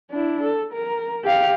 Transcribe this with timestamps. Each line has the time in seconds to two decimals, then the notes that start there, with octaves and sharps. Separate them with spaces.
0.11 D4 E4
0.43 A4
0.73 A#4
1.24 G4 F5